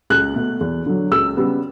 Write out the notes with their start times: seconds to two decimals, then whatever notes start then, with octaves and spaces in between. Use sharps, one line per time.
0.10 C#2 F#6
0.36 B2 A3
0.61 E2
0.86 D3 F#3
1.11 C#2 E6
1.37 C#3 G3 B3